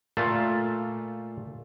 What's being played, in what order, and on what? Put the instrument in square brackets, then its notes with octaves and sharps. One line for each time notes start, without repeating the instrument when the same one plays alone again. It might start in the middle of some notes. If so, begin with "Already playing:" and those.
[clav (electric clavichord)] A#2 A3 F4 A5